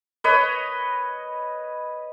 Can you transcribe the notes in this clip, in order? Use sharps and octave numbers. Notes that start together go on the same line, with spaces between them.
B4 C#5 D#5